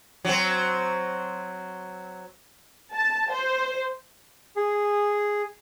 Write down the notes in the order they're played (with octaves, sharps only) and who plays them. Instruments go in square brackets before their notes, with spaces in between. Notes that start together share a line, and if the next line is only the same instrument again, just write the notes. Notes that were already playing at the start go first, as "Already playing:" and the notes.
[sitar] F#3 C4
[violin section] A5
C5
[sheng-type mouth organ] G#4